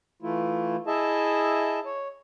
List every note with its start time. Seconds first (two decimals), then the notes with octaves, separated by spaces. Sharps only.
0.22 E3 A3 E4 F4
0.87 E4 G#4 D#5 E5 A5
1.85 C#5